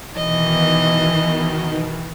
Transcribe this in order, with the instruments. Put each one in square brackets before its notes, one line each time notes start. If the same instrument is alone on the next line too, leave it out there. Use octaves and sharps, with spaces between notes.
[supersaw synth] B2 D#3 [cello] E3 [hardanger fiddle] D#5